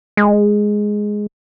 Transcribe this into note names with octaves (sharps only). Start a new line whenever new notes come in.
G#3